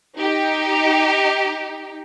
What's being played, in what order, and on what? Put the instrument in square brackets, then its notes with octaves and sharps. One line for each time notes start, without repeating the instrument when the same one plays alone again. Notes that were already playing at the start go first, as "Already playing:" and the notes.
[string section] D#4 G4